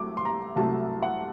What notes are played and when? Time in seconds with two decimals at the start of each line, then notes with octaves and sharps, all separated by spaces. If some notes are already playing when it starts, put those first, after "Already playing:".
Already playing: C2 C3 F#3 A3 D6
0.17 C6
0.25 A#5
0.56 C2 C3 F#3 A3 A5
1.02 F#5